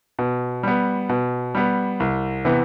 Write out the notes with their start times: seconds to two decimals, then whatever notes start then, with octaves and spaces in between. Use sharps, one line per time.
0.19 B2
0.63 G3 B3
1.09 B2
1.55 G3 B3
2.00 C2
2.45 C3 E3 B3